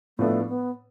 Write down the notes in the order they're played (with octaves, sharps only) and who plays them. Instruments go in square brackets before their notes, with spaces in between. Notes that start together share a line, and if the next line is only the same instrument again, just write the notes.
[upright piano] A2 F3 B3 D4 [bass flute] A3
[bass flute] B3